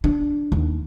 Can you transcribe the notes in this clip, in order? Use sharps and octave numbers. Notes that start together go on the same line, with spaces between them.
D4
D#2